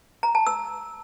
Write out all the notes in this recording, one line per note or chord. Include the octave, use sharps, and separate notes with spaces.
A#5
A5
E6